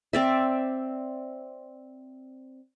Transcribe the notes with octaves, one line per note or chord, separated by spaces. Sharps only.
C4 D5 E5